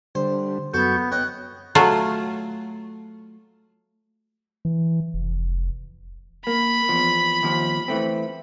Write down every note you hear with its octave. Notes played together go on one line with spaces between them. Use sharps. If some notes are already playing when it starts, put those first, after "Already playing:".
D3 G3 C5
F#2 B3 F#4 A4 A5 C#6 G6
B3 C#5 D#5 G5 F#6
F#3 A3 F4
E3
F1
A#3 B5
E2 F3
D#2 F3
E3 A3 C4